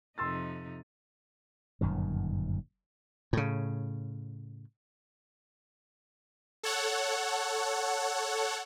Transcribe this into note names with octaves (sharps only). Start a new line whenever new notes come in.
F2 C3 D#4 C6 E6 A6
G1 F#2 A#2 D#3
A2 C#3
A4 C#5 F#5